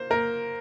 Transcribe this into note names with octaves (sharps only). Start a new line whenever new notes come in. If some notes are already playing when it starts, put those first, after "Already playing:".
Already playing: A#3 C5
A#3 A#4